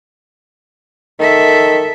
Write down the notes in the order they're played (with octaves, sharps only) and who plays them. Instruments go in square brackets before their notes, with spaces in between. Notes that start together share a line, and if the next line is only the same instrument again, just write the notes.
[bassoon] D#3 [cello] A4 E5